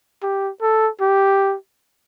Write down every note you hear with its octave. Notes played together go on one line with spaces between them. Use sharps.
G4
A4
G4